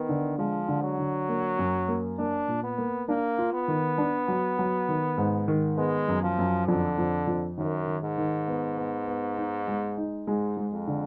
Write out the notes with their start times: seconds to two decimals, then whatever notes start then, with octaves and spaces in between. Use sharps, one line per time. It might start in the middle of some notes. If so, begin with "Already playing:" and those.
Already playing: D#3 B3
0.09 D3
0.38 F3 G#3
0.68 D3
0.83 F#3
0.99 D3
1.29 A#3
1.59 F#2
1.88 A#3
2.19 A#3 D4
2.48 A#2
2.64 B3
2.78 A#3
3.08 A#3 D4
3.38 F4
3.53 B3
3.68 D#3
3.98 D4
4.28 F#3
4.59 F#3
4.89 D#3
5.18 G#2
5.48 D#3
5.78 G#3 B3
6.08 F#2
6.23 F3
6.38 F#2
6.68 F2 D3
6.98 F2
7.27 F2
7.57 F#2 D#3
7.87 D#3
8.03 G#2
8.18 D#3
8.48 B3
8.77 B3
9.07 B3
9.37 D#4
9.68 G#3
9.97 D#4
10.27 G#2 G#3
10.57 G#3
10.72 F2
10.87 D3